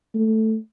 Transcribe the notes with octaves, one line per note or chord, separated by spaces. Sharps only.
A3